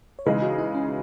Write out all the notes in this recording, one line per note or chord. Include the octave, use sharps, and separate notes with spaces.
C#5
C#3 E3 G#3 D#4 B4
F#4
E4
C#4